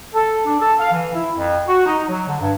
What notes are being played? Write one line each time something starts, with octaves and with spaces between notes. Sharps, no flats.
A4
D4
A4
F5
E3
E4
F2
F#4
D#4
F#3
D3
G2